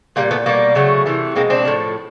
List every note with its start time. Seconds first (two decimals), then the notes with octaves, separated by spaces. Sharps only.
0.16 A#2 G3 A#3
0.31 A3 B3
0.46 B2 G3 A#3
0.75 C#3 F#3 A3
1.06 C3 E3 A3
1.35 B2 G#3 A#3 C4
1.50 C4 D4
1.65 A2 F3 A3